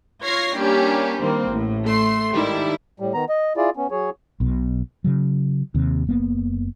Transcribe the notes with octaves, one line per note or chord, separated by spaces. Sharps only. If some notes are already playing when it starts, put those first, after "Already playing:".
F4 C#5 G#6 A#6 C7
G3 A#3 C#4 D4 G4
D#3 G3 A#3 C4
A1 A2
A3 C6
G#2 D#3 G3 D4 E4
A2 G3
D#3 B3 A#5
D#5
E4 F4 G#4 D5
B3 C#4
F#3 G#4 C#5
B1 B2
C#3 F#3
D#2 C3
F#1 A#3 B3